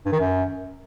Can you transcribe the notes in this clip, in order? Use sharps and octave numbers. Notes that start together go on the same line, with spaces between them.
G2
D#3
F#2